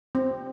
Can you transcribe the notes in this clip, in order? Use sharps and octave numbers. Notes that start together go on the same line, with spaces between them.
C4